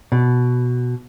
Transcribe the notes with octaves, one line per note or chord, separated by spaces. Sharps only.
B2